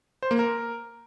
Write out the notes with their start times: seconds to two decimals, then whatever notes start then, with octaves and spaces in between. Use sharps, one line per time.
0.23 C5
0.31 A#3
0.39 A#4